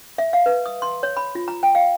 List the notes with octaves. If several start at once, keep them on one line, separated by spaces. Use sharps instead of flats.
E5
F5
B4
D#6
C6
C#5
B5
F4
A#5
G5
F5